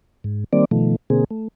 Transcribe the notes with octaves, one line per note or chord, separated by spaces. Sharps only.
G#2
D#3 G3 A#3 C4 D5
B2 D#3 F3 A3
B2 D3 A#3 C4 G#4
A3